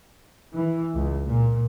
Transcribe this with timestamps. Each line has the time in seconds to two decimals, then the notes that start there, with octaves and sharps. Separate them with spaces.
0.54 E3
0.95 C#2
1.26 A#2